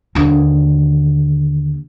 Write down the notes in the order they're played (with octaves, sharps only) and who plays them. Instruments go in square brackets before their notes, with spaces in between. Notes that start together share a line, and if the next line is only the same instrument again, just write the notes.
[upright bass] D#2 D3